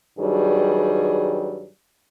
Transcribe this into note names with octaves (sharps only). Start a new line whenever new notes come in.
G2 D#3 F#3 G3 G#4 B4